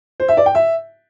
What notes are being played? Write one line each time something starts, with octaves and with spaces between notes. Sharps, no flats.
C5
E5
D5
G5
E5